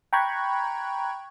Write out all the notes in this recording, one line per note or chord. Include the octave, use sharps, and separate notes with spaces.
G5 A#5 B5 C#6 F#6 G#6